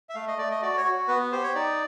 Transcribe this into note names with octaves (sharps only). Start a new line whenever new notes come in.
E5
A3 F5
D#5
A3 D5
D#5
F#4 D5
C#5
F#4
B3 B4
G4 C5
C#5
D#4 D5